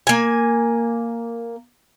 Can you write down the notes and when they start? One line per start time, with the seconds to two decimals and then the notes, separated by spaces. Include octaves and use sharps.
0.07 A#3 G#5